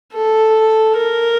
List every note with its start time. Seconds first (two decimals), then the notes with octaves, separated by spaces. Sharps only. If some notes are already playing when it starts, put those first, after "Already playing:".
0.14 A4
0.97 A#4